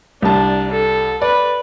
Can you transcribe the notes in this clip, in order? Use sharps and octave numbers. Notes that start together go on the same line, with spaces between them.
C2 D4 A5
A4
B4 D5